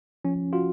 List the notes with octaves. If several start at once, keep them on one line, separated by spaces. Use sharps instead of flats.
F3 C#4
F4 F#4